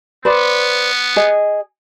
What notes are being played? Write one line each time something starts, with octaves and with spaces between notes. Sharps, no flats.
B3 B4 C5 D5
G#4 D#5